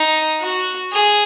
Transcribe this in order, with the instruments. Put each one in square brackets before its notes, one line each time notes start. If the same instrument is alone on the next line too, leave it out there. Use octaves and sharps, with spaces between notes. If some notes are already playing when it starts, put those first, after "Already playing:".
Already playing: [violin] D#4
F#4
G#4